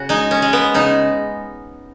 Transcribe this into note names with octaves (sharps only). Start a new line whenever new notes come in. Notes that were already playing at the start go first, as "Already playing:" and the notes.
Already playing: C#3 F#4
G#3 D#4
C#4
G#3
B3
C#3 D#4